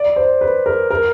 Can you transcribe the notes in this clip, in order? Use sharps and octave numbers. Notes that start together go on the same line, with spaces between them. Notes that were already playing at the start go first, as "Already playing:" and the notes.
Already playing: D5
C5
B4
A#4
A#4